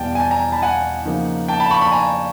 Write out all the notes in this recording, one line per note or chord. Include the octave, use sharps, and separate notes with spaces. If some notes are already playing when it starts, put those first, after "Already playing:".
Already playing: E2 B2 G3 B3 E4 G5 A5
G#5
G5 A5
G#5 A#5
A5 B5
F#5 G#5
C#3 F3 A#3 D#4
G5 A5
A5 B5
B5 C#6
A5 B5
G#5 A#5